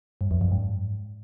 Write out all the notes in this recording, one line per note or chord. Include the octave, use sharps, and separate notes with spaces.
G2
F2
F#2
G#2